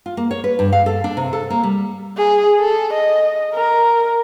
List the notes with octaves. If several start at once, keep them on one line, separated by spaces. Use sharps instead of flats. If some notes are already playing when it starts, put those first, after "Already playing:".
F4
A#3
C#5
B4
G2
F5
A4
D4
C3
A4
A#3
G3
G#4
A4
D#5
A#4